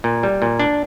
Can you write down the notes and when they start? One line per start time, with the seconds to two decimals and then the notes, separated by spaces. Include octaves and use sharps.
0.04 A#2
0.23 G3
0.42 A#2
0.60 D4